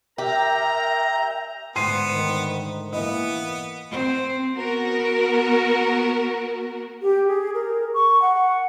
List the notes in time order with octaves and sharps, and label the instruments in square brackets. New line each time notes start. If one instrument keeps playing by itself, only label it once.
[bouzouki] G4 [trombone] A#4 [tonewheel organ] E5 G5 [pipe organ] A#5
[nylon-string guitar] D2 G#2 [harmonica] B3 [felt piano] C6 C7 D#7
[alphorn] D#3
[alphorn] E3 [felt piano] A#3 D#5 [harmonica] B3
[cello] C4
[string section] B3 F#4 A#4
[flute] G4
G#4
A#4
C#6
F#5